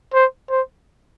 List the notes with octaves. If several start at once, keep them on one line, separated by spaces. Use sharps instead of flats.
C5
C5